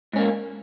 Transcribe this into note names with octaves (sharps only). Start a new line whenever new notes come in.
G#2 A#3 C#4